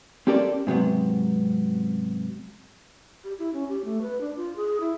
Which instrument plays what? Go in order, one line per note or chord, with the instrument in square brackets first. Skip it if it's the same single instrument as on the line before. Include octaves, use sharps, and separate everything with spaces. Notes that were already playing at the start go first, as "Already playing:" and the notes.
[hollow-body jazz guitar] C4 C#4 G4 A4 A#4 D5
G#2 C3 F#3 B3
[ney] G4
E4
C#4
G4
A3
B4
D4
F4
G#4
E4